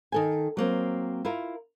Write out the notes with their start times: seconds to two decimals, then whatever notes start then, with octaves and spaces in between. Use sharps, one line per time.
0.12 D#3 A4 G#5
0.57 F#3 A#3 C4
1.25 E4 F4 A#4